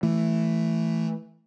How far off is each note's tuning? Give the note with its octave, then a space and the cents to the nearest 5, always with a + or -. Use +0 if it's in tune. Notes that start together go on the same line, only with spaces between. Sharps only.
E3 +0 A3 +0